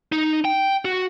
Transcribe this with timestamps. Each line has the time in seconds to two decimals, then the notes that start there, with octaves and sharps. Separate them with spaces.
0.12 D#4
0.45 G5
0.85 F#4